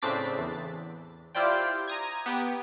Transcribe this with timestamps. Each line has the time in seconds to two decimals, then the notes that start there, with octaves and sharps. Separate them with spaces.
0.02 A2 C#3 C4 D4 A6 B6
0.39 E2
1.35 E4 F4 G4 C5 D5 G5
1.88 A#5 D#6 G#6
2.26 B3 G4